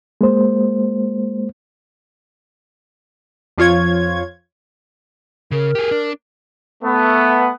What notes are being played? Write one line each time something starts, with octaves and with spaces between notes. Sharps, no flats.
G#3 A#3 C5
F2 F3 F4 C#5 G#6
C#3 A#4
G4 G#4
D4
A3 B3